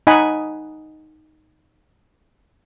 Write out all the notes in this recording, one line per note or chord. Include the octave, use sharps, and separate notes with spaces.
D#4 D#5 F#5 G#5 B5